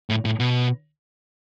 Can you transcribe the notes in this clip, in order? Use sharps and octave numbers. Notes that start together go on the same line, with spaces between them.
A2
A2
B2